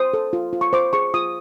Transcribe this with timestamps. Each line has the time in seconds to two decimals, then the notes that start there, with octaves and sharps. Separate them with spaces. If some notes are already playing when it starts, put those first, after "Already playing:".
Already playing: C5 D#6
0.14 A4
0.33 F4
0.53 F4
0.61 C#6
0.73 C5 D6
0.93 G#4 C#6
1.14 F4 D#6